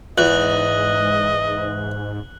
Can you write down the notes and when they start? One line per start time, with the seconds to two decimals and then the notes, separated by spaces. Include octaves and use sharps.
0.18 E2 G#2 D#5 F#6 F#7